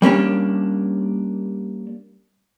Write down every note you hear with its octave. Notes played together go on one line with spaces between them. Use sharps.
G3 A#3 C#4 D4